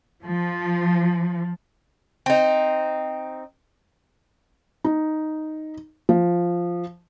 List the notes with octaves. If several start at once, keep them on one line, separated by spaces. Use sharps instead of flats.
F3
C4 D#4
D#4
F3